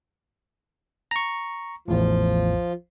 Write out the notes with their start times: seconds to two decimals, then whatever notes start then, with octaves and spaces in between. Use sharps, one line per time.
1.11 A#5 C#6
1.88 A1 E2 A2 F3 F4